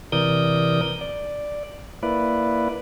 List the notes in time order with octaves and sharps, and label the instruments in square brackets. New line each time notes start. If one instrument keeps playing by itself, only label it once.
[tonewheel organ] C3 E3 A#4 D5 D#6 G6
D5
A#3 E4 B4 D5